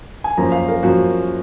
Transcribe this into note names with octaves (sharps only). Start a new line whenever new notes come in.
G#5
F#2 F3 A#3 A#5
F5
A#4
F#2 F3 A#3 F#4